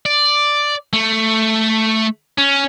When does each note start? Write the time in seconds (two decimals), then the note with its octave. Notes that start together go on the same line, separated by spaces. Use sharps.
0.06 D5
0.93 A3
2.38 C#4